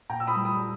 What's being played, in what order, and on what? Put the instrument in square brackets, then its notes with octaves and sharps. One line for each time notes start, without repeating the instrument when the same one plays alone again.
[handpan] A#2 [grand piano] G5 A#5
[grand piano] E6
B5 D#6
[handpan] G3
[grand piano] B5 D#6